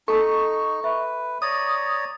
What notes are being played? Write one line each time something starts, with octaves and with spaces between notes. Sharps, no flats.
D#4 A4 A5 C#6
B4 E5
C#5 D5 A#5 D#6